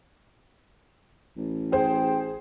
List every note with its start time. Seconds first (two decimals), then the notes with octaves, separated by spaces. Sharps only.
1.37 A1
1.72 G#4 C5 G5